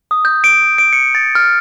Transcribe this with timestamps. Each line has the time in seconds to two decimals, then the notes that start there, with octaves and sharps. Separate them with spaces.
0.11 D#6
0.25 G6
0.44 D7
0.78 D7
0.93 C#7
1.15 A6
1.35 F6